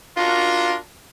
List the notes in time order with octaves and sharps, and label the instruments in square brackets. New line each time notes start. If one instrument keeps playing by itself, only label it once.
[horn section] D4 F#4 A#4 [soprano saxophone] F4